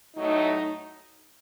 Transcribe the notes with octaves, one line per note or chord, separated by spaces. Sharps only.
A2 F#3 A3 D#4